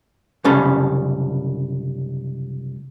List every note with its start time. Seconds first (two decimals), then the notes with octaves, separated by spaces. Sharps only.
0.44 C2 F#2 C#3 G3 C#4 A4